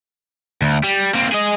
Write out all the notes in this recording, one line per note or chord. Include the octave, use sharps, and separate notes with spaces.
D2
G3
A#3 C4
G#4 D#5